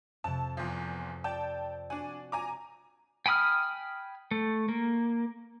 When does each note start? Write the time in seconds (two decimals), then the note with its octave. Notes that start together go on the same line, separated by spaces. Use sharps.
0.24 F2 C3 A5
0.57 E2 F3
1.24 D5 G5 A5
1.90 D4 F#4 G#5
2.32 G#5 A#5 D6
3.26 G5 G#5 B5 D#6 F6
4.31 A3
4.69 A#3